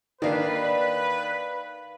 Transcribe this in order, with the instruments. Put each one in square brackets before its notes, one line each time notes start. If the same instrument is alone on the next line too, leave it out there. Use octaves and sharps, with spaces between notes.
[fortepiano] D#3 A#3 D4 [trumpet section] B4 [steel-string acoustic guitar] D5 F5